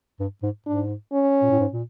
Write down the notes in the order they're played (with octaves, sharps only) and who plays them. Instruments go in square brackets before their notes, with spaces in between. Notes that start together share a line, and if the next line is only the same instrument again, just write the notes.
[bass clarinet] G2
G#2
[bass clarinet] G#2 [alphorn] D4
[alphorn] C#4
[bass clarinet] A#2
A2
G#2
A#2